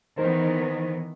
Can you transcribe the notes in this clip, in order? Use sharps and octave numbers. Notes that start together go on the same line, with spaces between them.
D#3 E3 B3 D#4 A#4 C5